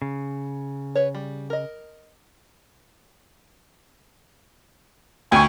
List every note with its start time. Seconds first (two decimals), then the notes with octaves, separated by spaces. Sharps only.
0.02 C#3
0.95 B4 C#5
1.15 G3
1.50 A#4 D#5
5.32 D2 G5 G#5 C#6